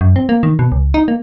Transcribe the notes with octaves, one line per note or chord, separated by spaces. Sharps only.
F#2
C4
A#3
D#3
B2
C#2
D#4
A#3